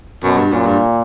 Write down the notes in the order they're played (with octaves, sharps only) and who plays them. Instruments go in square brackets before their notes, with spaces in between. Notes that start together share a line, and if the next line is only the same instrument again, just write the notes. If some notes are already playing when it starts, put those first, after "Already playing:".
[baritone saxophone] F#2 [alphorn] B2
[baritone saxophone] G2
[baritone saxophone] F#2 [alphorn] A#2
[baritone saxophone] G2